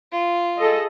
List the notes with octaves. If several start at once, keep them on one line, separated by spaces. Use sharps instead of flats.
F4
G#4 A4 D#5